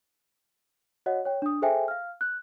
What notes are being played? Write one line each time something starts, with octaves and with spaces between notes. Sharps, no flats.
F#4 C#5 D#5 F#5
C#5 G5
D4 D#6
G#4 A4 C5 E5 G5 G#5
F5 F6
F#6